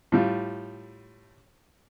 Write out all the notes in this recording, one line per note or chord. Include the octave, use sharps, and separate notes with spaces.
A2 G3 F4